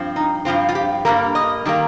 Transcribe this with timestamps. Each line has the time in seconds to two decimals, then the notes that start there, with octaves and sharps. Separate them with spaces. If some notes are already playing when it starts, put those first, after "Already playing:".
Already playing: G2 F3 C4
0.16 D#4
0.45 G2 F3 C4 F4
0.69 F4
0.75 G4
1.05 G2 D#3 G3 A#3 A#4
1.35 D#5
1.65 D#3 G3 A#3